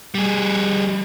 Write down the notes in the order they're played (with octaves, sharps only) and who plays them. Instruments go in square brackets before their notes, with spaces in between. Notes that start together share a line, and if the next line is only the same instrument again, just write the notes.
[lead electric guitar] G3 G#4